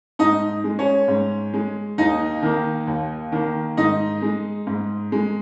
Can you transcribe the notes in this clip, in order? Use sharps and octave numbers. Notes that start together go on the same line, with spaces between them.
G#2 D#4 D#5
G#3
C#4 C#5
G#2
G#3
D#2 D#4 D#5
D#3 A#3
D#2
D#3 A#3
G#2 D#4 D#5
G#3
G#2
G#3